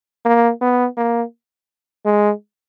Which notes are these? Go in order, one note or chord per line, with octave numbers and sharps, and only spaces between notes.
A#3
B3
A#3
G#3